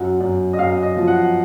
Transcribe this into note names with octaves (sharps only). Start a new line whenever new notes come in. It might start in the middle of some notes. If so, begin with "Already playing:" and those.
Already playing: F#2 F#5
F#2
D#5
F#2 F5
D#5
F3
F#5